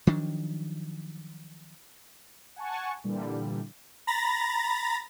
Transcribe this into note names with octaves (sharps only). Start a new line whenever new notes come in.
D#3 F3 F#3 D4
F#5 G#5 A5 C#6
A#2 D3 E3 G3
A#5 B5 A6 A#6